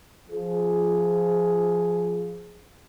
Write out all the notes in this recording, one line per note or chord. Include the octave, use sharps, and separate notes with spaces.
F3 G#4